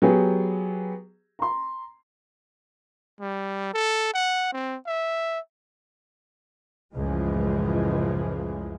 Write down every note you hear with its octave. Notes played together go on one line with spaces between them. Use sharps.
F#3 B3 G4 G#4
A#5 C6
G3
A4
F#5
C4
E5
C#2 F#2 A2 E3 F3 G#3